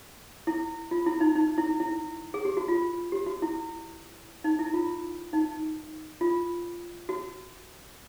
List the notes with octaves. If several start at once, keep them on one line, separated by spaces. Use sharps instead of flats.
E4
F4
E4
D#4
D#4
E4
E4
G#4
G4
F#4
F4
G4
F#4
E4
D#4
E4
F4
D#4
F4
F#4